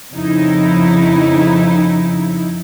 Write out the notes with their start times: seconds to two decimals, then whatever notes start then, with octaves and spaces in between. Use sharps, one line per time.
0.12 F2 C#3 D#4 E4